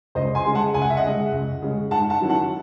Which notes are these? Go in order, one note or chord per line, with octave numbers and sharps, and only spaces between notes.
C#2 C5 D#5
G#5 C6
C#3 G#3
F#5 A5
C#2 G#5
F#5
E5
D#5 F#5
C#3 G#3
C#2
C#3 G#3
G#2 F#5 A5
F#5 A5
D#3 F#3 C#4 E4
F#5 A5